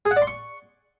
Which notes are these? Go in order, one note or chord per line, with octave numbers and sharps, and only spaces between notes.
G#4
F#5
D5
C6
C#6